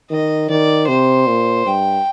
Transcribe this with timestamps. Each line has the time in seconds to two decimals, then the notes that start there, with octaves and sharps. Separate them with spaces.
0.11 D#3 D#5
0.50 D#3 D5
0.88 C3 C5
1.27 A#2
1.66 G2 G5